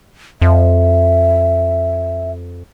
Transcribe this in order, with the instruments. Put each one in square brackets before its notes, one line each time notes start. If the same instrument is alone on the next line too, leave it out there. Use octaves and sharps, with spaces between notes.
[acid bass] F2 [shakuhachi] E5